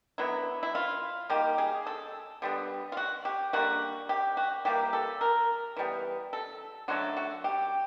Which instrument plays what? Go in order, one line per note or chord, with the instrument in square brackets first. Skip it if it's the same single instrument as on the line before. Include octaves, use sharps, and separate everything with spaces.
[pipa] D3 F#3 B3 E4
E4
F4
D#3 G3 A#3 G4
G#4
A4
D3 G3 B3
F4
F#4
G4
D3 G3 A#3 F#4
G4
F#4
E3 G3 A#3 G4
A4
A#4
E3 G3 B3
A4
D3 F#3 A3 F#4
F#4
G4